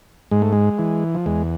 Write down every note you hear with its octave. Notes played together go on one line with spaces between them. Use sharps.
G#2 G#3
A3
G#3
E3
F3
E2 G#3